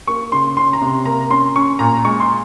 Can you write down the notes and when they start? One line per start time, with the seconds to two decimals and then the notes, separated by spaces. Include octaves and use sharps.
0.07 A#3 C#6
0.32 C#3 C6
0.57 C#4 C6
0.73 A#5
0.82 C3
1.06 A#3 A#5
1.30 C#4 C6
1.56 C#4 C#6
1.79 A#2 A#5
2.05 G#3 C#6
2.20 C6